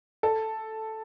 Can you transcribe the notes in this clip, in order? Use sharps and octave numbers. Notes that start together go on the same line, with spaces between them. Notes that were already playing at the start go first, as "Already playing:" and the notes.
A4